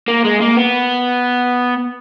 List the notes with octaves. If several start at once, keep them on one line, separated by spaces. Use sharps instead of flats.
A#3
G#3
A#3
B3